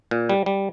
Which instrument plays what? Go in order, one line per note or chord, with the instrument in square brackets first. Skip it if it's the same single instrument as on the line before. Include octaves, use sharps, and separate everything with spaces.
[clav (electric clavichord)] A#2
G3
G3